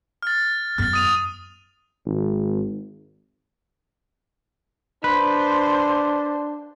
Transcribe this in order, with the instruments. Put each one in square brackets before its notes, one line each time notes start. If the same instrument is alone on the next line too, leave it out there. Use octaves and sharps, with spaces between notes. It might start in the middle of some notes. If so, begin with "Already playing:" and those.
[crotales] F6 A6
[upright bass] F#2 B3 [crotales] F6 A6
[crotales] D#6 D#7 F7
[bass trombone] G#1
[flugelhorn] D4 [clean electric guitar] B4 [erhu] C5